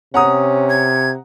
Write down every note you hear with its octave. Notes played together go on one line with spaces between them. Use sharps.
C3 C#4 F#5 A#5 D#6
G#6